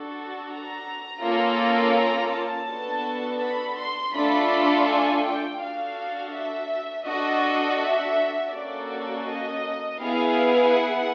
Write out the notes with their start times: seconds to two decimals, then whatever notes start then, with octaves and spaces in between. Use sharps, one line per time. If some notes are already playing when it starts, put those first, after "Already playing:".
Already playing: D4 F#4 A4
0.49 A#5
1.22 A#3 C#4 F4 A4
1.95 A#5
2.32 A5
2.68 B3 D4 F#4 A4
3.42 B5
3.77 C6
4.14 A3 D4 F4 A4 B5
4.87 G#5
5.24 G5
5.61 D4 F#4 A4 F5
6.33 E5
7.07 D4 F#4 A4 D#5
7.80 E5
8.53 A#3 C#4 F#4 A4 D5
9.27 D#5
10.00 B3 E4 G#4 F5
10.72 F#5